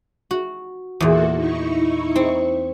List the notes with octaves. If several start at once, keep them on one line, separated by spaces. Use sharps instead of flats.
F#4
E2 A#2 A#3 F#4 A4
D#4 E4 C#6
C4